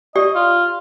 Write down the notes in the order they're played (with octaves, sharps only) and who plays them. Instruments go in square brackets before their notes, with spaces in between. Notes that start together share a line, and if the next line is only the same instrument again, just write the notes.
[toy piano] G4 D5 [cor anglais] D#5
[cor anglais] F4